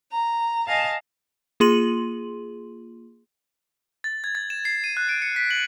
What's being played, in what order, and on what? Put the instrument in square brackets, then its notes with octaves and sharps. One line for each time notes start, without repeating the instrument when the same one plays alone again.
[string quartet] A#5
D#5 F5 G#5 A5
[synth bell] A#3 F4 G#4 C6 D#7 F#7
[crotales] A6
G#6
A6
E7
C7
D#7
F#6
D7
C#7
B6
F#7